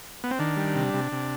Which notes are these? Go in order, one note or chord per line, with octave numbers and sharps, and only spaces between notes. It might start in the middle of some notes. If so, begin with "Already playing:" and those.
B3
C4
D#3 D4
G3
C3
C3
C3